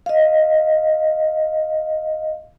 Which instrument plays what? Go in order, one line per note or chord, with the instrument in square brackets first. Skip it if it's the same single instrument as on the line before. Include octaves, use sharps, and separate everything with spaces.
[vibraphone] D#5 F5